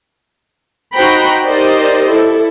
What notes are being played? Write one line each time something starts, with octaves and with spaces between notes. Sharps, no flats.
D#4 F#4 C5 G5 A#5 B5
D#4 G4 A#4 C5 D5 D#5
E4 A4